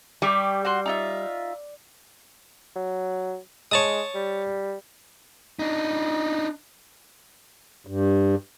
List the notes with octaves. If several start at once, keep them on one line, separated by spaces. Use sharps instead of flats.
G3 G4 C#6 D6
F#4 F#5 C6
D#4 F4 E5
F#3
G#3 C#5 A5 D#6
G3
D4 D#4
G2